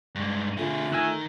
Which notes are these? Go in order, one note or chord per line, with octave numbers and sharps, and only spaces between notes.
G2 G#3
D3 A3 F4 G#4
D#3 G#5 E6 F#6